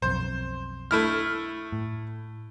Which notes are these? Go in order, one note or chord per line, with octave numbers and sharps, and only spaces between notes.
B1 F2 C5
A3 E4 F6
A2